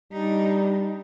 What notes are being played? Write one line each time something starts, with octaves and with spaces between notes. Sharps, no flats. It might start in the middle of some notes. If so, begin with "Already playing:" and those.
G3 D4 D#4